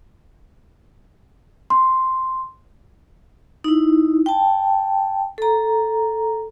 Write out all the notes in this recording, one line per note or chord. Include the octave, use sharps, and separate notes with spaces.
C6
D#4 E4
G5 A5
A4 A#5